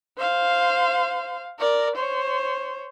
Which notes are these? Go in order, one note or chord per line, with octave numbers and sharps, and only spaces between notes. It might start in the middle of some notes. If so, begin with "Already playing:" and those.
C5 F5
A#4 D5
C5 C#5